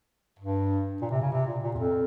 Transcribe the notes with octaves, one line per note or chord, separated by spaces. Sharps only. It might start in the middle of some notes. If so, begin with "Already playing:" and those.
G2
A#2
C3
C#3
C3
A#2
A#2
E2
F2